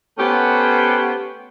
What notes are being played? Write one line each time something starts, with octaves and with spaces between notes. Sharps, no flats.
A3 B3 C#4 G4 C5 F#5